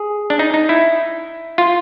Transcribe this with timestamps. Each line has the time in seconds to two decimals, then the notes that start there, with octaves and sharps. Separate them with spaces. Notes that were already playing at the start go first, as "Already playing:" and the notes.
Already playing: G#4
0.30 D4
0.39 D#4
0.54 D#4
0.69 E4
1.58 F4